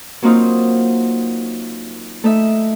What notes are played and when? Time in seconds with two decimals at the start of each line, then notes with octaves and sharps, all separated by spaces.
0.22 F#3 A#3 C4 D#4 F4
2.24 A3 D#4 E5